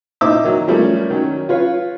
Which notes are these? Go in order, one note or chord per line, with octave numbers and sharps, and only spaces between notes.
A#2 D#4 E4 C5 D6 E6
D#3 F#3
F3 G3 A3 A#3 C#4
D#3 F#3 C#4
F4 B4 C#5 F5